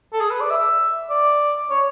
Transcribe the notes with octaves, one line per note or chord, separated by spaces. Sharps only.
A4
G#4
B4
D5
E5
D5
C#5